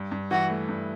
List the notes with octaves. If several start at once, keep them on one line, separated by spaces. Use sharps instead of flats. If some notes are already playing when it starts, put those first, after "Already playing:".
Already playing: G2
G2
E3 F#4
A3
G2